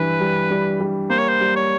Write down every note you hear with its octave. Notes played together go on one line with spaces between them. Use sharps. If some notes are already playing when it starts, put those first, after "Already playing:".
Already playing: G2 E3 G3 B4
G3
G3
G3
A#3 C5
C#5
C5
G3
C#5